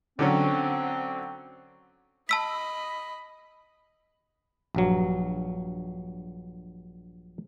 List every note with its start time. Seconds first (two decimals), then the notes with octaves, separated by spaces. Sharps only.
0.19 D3 F#3 C4 C#4
2.29 D#5 A5 B5 E6 B6
4.75 A#1 G2 F#3